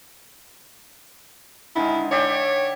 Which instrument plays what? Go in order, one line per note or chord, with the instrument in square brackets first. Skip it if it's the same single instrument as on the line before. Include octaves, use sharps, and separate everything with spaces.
[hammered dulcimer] D3 D#3 G#3 [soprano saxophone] E4
[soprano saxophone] C#5 [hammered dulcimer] D5 E5 G5